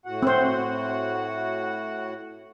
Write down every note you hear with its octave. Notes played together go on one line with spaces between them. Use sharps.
A2 F#4 F#5
C4 C5